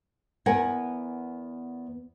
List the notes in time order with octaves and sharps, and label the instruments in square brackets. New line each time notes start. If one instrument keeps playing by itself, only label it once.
[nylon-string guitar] E2 B3 A#4 F#5 G#5